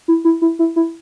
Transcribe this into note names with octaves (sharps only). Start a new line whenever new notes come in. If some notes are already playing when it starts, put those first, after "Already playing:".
E4
E4
E4
E4
E4